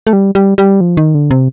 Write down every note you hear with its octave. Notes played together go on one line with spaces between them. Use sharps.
A3
G3
G3
G3
F3
D#3
D3
C3